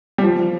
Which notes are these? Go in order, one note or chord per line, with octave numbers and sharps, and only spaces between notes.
G3
F3